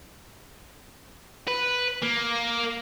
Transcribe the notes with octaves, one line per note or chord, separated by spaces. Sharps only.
B4
A#3